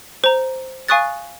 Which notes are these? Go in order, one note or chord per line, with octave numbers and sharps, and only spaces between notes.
C5 A#5
F5 G#5 C#6 D#6 F#6 A6